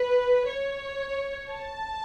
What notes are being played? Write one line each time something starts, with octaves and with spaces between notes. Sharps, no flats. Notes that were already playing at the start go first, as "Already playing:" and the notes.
Already playing: B4
C#5
A5